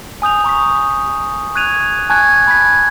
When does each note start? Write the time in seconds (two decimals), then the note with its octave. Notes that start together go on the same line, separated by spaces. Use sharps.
0.22 G#5 D#6 G6 F7
0.44 A#5 C#6 D#6 B6
1.55 C#6 F#6 G#6 D#7 F7
2.10 G#5 A5 C#6 F#6 G#6
2.48 B5 G#6 B6